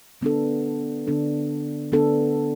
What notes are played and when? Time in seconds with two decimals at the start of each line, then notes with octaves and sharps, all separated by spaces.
0.21 D3 B3 D4 A4
1.07 D3 B3 D4 A4
1.92 D3 B3 D4 A4